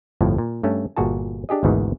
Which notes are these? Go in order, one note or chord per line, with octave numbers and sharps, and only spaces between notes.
G1 F2 A2 F3
A#2
G2 A3 C#4
G1 A#2 F#4 G#4 A5
D4 G4 G#4 D#5
G#1 D2 G#2 B2 D#3 E3